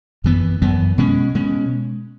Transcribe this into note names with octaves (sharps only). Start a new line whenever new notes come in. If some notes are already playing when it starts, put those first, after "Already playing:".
F#2 E3 B3
F#2 E3 B3
B2 G#3 C#4
B2 G#3 C#4